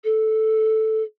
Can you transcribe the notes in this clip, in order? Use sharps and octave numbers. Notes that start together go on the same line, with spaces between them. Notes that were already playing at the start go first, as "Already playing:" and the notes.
A4